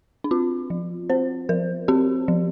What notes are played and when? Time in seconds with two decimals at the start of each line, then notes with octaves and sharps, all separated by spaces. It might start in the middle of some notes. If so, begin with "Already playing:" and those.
0.24 D4
0.31 C4 F4
0.70 F3
1.10 C4 C5
1.49 F3 A#4
1.88 C4 G4
2.28 F3